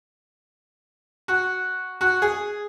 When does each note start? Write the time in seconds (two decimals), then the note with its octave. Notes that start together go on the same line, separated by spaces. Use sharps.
1.28 F#4
2.01 F#4
2.22 G#4